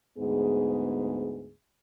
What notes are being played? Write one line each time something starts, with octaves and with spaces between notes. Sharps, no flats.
D2 G#2 B3 G#4